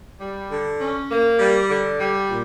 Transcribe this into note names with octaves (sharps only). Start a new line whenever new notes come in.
G3
D3
C#4
A#3
G3
D3
G3
A#2